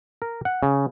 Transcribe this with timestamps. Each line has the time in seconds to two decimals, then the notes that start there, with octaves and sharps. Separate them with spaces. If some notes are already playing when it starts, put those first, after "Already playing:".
0.22 A#4
0.45 F#5
0.63 C#3